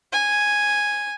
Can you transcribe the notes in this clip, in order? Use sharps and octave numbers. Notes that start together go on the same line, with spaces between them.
G#5